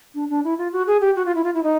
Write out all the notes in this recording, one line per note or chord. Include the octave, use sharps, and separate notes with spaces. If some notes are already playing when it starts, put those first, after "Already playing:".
D4
D4
E4
F4
F#4
G#4
G4
F#4
F4
E4
F4
E4
D#4